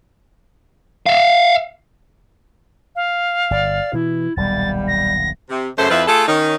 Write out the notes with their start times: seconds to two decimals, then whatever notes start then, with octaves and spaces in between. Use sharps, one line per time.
1.06 E5 F5
2.96 F5
3.51 G1 D5
3.93 B2 E3 E4
4.37 D#1 B1 G3 A6
4.88 A#6
5.49 C3
5.77 F#2 C#3 A3 A4 C5
5.90 F2 F3 E4 B4 E5 F5
6.07 A3 F4 G#4 A4
6.27 D#3 C#4 D#4